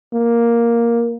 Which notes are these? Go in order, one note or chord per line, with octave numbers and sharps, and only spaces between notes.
A#3